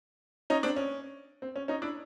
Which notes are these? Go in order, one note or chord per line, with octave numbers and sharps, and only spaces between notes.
C#4 D#4
C4 D4
C#4
C4
C#4
C#4 D#4
D4 E4